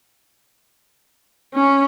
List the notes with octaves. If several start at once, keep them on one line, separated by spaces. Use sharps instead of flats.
C#4